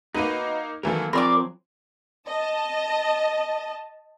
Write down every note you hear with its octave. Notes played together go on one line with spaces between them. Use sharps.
A#3 D#4 F#4 B4 D#5
D#3 E3 F#3 A#3 A4 A#4
F3 C4 G#4 A#4 C#5 D5 B5 D6
D#5 A5